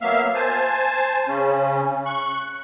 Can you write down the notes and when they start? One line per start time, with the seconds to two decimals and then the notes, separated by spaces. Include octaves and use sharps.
0.01 F#3 A#3 B3 E5 F5 F6
0.35 C5 G#5 A5
1.28 C#3 C#4
2.06 C#6 F#6